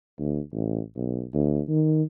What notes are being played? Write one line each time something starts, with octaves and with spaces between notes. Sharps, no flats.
D2
A1
B1
D2
D#3